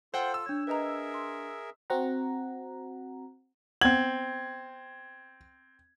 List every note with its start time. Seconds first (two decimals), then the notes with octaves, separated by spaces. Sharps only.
0.14 F4 A4 C5 F#5 G5
0.34 E6
0.46 D4 C#5 G#6
0.67 G#4 A#4 B4 D#5 E5 A#5
1.14 C6
1.90 C4 F#4 F#5 A#5
3.81 B3 C4 F#5 G#6 F#7